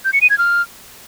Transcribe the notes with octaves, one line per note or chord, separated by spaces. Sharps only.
G6
C#7
D#7
G#6
F6